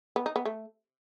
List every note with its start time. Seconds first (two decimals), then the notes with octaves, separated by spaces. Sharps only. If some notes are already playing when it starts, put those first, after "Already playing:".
0.16 B3
0.26 D#4
0.36 B3
0.45 A3